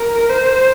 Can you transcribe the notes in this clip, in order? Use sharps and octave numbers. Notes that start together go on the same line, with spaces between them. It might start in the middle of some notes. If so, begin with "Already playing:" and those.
Already playing: A#4
C5